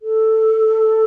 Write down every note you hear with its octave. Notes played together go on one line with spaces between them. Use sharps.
A4